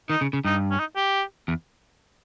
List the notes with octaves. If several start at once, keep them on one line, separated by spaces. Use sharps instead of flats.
D#3 D#4
C#3
C#3
G2 D#4
C#4
D#4
G4
E2